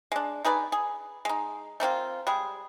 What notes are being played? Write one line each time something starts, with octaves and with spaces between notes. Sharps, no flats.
G#3 D4
D#4 G#4 B4 D5
G#4
G#3 D#4
A3 A#3 C4 F4
G3 G#3 G#4